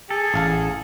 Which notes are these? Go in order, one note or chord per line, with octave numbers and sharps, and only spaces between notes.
G#4 A4
A1 F5 A5